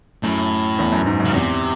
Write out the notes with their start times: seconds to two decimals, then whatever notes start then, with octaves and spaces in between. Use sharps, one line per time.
0.23 F#2 A2
0.79 E2
0.92 F#2
1.06 G#2
1.20 F#2 C#3
1.34 E2 C3